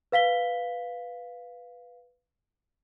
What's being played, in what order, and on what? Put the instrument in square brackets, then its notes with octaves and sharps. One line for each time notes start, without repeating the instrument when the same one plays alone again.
[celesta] B4 F5 B6 G7